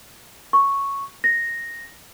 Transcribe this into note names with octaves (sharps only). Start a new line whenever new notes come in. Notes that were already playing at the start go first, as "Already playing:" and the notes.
C#6
A#6